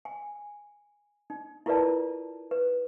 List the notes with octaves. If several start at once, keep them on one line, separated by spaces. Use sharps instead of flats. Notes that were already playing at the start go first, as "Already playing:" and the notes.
G#5
D#4
E4 F4 A#4 B4 D5 A5
B4